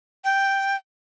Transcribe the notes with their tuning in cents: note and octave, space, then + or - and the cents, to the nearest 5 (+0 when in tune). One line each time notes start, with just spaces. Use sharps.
G5 +0